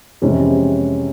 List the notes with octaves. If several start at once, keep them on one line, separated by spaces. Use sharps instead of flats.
F2 C3 E3 G#3 C#4